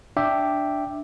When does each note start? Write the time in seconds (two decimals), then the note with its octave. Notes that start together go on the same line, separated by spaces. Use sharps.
0.17 D4 E5 G5 D6